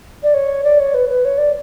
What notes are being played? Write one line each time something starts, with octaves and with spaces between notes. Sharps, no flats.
D5
C#5
D5
C#5
B4
B4
C#5
D5